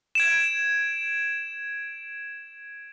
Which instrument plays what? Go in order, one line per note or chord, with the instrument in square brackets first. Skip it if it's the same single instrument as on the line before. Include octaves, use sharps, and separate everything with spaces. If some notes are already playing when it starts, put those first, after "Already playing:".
[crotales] G#6 D7 E7